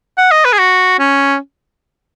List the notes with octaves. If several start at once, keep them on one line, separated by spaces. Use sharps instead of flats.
F#5
D#5
B4
G#4
F#4
C#4